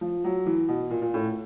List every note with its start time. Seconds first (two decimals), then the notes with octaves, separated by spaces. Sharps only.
0.01 F3
0.25 F#3
0.46 E3
0.68 B2
0.90 A#2
1.02 A#2
1.14 A2